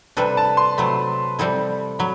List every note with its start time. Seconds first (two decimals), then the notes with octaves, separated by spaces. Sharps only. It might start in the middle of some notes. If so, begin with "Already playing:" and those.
0.17 C3 G3 D4 A4 B4
0.37 A5
0.57 C6
0.78 C3 F#3 A3 B5
1.39 G3 C4 E4 A4
1.99 F#3 B5